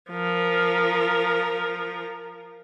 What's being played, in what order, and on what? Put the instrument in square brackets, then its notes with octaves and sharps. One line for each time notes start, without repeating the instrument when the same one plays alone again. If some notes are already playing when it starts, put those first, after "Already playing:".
[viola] F3 A#4